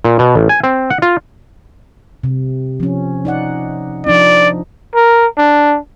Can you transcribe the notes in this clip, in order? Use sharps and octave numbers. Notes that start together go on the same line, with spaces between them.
A#2
B2
A1
G#5
C4
F#5
F4
C3
F3 C#4
D#4 D5 F#5
F3 D4 D#4 D5
A#4
D4